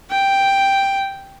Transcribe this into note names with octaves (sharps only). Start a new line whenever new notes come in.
G5